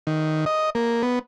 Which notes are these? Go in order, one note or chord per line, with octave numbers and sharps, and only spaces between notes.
D#3
D#5
A#3
B3